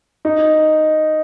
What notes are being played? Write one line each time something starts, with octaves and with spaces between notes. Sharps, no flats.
D#4